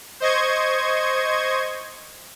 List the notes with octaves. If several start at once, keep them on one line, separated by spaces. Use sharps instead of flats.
C5 D#5 C#6 G#6